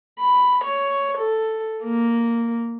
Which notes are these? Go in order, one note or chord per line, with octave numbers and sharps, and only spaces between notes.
B5
C#5
A4
A#3